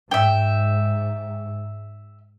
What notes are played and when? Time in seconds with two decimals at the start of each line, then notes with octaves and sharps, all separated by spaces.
0.11 G#2 E5 G5